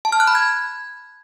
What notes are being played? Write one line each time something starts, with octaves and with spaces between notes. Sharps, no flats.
A5
F6
F#6
B5
G#6